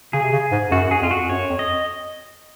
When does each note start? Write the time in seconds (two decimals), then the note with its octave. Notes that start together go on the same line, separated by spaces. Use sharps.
0.13 C#3 G#4
0.23 C3
0.32 C#3
0.52 G#2
0.71 F#2 F#4
0.91 G#4
1.01 F2 F4
1.11 F#4
1.29 F#2 C#5
1.49 F2
1.59 D#5